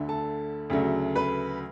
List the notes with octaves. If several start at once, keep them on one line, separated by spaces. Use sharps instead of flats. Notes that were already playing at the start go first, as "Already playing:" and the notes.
Already playing: D2 D3 A3
A4 A5
D2 C#3 F#3 A3
B4 B5